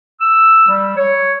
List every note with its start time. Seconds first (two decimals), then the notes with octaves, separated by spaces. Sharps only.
0.21 E6
0.68 G3
0.97 C#5